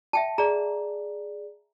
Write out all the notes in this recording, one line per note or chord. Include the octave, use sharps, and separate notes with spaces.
E5 G5 A5
G#4 D5 A#5